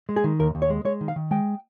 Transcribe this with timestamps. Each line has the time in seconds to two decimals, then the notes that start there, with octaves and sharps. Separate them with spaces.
0.09 G#3
0.16 G#4
0.24 D#3
0.39 D#2 A#4
0.55 D#2
0.62 C#5
0.70 G#3
0.85 G#3 C#5
1.01 D#3
1.08 F5
1.16 D#3
1.31 G#3 G5